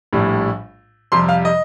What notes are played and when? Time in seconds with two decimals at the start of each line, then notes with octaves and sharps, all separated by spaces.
0.13 A#1 A2 G3
1.12 F2 C3 G3 C6
1.29 F5
1.45 D#5